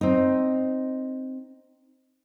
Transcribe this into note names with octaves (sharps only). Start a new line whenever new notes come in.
C4 D#4